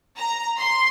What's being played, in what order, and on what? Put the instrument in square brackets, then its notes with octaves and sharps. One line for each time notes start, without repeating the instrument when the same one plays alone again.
[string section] A#5
C6